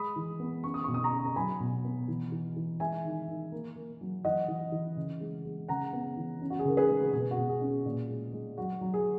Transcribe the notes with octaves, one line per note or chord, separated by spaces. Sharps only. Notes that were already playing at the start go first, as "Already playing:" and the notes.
Already playing: G#3 B5 D#6
E3
B3
C#4 C#6
D#6
B2 C#6
D#6
A#5 C#6
C#4
A#5
F#3 G#5 B5
B2
B3
E3
E3
E3
G#3 E5 G#5
D#3
D#3
A#3
A#3
F#3
E3 D#5 F#5
E3
E3
C#3
G#3
G#3
C#3 F#5 A#5
B3
E3
C#4
F#4
G#4
C#3 A#4
G#4 B4
G#3
B2 G#4
F#4
B2
G#4
C#4
G#4
A#2
G#3
G#3
F#3 F#4
F#3
G#4